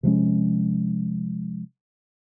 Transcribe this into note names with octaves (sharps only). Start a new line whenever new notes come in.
C3 F3 G#3 C#4